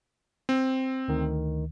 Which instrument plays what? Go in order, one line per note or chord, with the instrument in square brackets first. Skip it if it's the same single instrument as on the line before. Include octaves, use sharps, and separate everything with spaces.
[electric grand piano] C4
[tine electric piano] D2 D#3